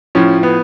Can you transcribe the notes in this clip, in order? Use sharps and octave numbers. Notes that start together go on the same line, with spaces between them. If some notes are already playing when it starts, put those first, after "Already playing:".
A2 F3 C#4
B3